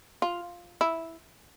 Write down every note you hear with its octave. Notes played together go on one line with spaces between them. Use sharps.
F4
E4